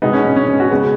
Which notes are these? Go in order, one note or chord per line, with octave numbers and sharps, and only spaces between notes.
B2 G#3 B3 D#4
C#4
C#4
C#4
C#4
F#4
C#3 G#3 B3 B4